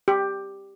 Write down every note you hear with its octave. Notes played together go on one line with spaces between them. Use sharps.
G4